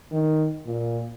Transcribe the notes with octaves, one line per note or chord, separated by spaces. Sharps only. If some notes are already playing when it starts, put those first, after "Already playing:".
D#3
A#2